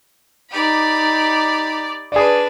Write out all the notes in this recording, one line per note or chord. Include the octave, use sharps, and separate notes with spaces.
D#4 G4 D5 B5
D4 G#4 B4 D5